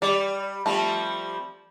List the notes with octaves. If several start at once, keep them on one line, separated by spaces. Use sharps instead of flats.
G3 D5
F3 G3 A3 C4